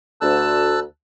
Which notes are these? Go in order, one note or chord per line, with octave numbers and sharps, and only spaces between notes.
D2 A5 E6 F#6